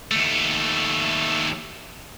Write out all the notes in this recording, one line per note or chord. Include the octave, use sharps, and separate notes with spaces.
D#2 A3